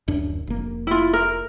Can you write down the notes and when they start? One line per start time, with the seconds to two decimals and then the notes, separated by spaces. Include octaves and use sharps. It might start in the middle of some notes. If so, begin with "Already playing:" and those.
0.08 D1 F#2 D4
0.47 F1 A#3
0.87 E4 F4
1.13 A#4